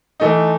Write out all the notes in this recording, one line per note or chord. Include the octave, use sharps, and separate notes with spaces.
E3 A3 D#4